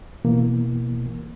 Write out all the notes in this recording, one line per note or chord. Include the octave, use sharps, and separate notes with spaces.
B2 E3 A#3